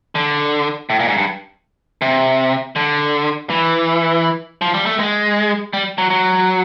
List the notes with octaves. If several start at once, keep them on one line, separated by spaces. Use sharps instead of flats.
D3
A2
A#2
G#2
G2
C3
D3
E3
F3
G3
A3
G#3
G3
F#3
F#3